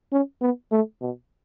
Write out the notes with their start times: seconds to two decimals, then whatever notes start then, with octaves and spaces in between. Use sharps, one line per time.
0.12 C#4
0.41 B3
0.72 A3
1.01 B2